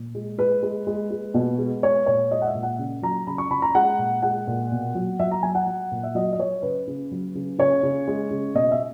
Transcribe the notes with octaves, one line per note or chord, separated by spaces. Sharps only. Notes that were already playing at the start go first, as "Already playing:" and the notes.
Already playing: A#2
G#3
G#3 B4
G#3
G#3
G#3
B2
G#3
G#3 C#5
A#2 C#5
G#3 D#5
F#5
E5
A#2
F#5
C#3
F#3 A#5
C#3 B5
C#6
C#3 B5
A#5
G#3 F#5
A#2
G#3 F#5
A#2
B2
F#3
F#3 E5
A#5
F#3 G#5
F#5
F#3
A#2
E5
F#3 D#5
D#5
F#3 C#5
C#3 B4
C#3
F#3
C#3
C#3 C#5
C#3
G#3
C#3
B2 D#5
E5